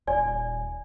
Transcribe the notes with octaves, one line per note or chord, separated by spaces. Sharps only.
D#1 D5 G#5